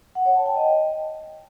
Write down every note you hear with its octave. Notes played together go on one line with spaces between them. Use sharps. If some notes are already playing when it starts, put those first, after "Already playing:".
F#5
C#5
A5
G5
D#5